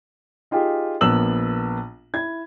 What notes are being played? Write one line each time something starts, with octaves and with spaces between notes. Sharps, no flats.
D#4 F4 G4 G#4
A#1 A#3 B3 E6 F#7
E4 G#6